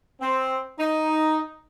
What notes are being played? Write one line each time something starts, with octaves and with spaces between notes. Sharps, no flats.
C4
D#4